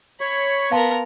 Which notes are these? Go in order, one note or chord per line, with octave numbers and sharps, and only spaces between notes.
C#5 B5 C#6
B3 A#4 F5 A5 C6